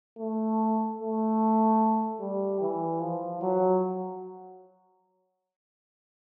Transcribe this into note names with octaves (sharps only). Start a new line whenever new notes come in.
A3
A3
G3
E3
F3
F#3